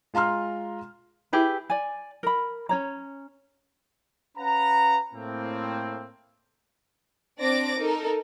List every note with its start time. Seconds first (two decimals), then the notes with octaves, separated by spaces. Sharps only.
0.14 G#3 F4 A#5 C6 F6
1.33 E4 G4 G#4 B4
1.70 D5 G#5
2.23 A#4 B5
2.69 C#4 C#5 A#5
4.37 C#4 B4 F5 F#5 A#5
5.14 A2 A#3 C4
7.40 C4 D4 D5 D6 A#6
7.79 D#4 A4 A#4